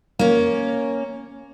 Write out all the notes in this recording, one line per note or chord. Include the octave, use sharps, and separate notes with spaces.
A#3 C#4